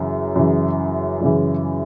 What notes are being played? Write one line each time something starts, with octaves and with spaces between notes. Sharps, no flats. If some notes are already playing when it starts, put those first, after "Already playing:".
Already playing: F#2 C#3 E3
F#2 C#3 E3
F#2 C#3 E3